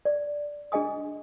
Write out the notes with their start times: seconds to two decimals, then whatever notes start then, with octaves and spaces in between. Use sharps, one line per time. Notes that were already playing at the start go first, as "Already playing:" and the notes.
0.05 D5
0.72 D4 G#4 D#5 G#5 D#6